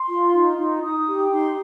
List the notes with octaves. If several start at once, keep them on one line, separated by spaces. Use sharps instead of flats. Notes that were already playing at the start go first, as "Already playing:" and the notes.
Already playing: C6
F4
D#4
D#4
D#4 D#6
G4
D#4 C6